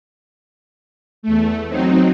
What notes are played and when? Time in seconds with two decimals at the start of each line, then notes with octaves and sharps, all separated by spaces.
1.23 E2 A3
1.68 F#3 C4 D#4